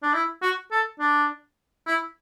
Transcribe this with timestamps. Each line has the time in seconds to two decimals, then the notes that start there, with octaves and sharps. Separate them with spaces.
0.03 D4
0.14 E4
0.42 F#4
0.71 A4
1.00 D4
1.87 E4